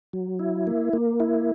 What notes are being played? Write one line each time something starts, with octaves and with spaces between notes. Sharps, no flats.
F#3
E4
A#3
A#3
E4